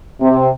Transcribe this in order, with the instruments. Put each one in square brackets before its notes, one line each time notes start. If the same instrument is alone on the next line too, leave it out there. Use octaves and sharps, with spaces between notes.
[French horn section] C3